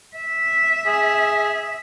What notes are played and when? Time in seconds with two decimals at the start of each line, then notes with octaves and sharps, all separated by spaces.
0.17 E5
0.86 G#4